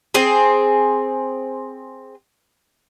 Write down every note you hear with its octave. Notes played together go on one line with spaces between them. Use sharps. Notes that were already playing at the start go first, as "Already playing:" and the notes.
C4 G#4